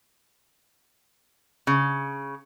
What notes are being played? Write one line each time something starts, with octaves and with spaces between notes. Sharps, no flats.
C#3